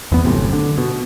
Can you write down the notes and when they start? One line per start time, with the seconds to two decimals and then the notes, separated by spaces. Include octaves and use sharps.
0.12 E2 B3
0.25 G1 F#2 A2 C3
0.53 D3
0.78 B2